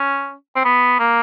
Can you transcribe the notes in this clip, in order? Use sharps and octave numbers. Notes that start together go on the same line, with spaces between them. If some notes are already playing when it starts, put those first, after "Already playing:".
Already playing: C#4
C4
B3
A#3